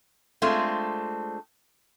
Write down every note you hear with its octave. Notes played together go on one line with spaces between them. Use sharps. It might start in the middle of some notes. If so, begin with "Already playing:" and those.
G#3 A3 C4 D4 F4